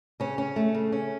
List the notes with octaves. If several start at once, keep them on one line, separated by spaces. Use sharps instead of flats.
C#3 C#4
C#4
A3
C#3
C#4